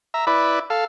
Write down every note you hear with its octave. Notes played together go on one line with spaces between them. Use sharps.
E5 A#5
E4 B4 D5
A4 F5